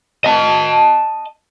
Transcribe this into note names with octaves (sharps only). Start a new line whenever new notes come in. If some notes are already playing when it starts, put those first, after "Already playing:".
D#5 A5